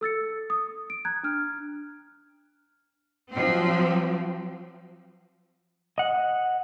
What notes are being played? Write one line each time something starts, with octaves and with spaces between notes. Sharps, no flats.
A4 E6 A6 C#7
D#6
D7
A#5 F#6 G#6
D4 F6
F3 F#3 C4
D#5 F#5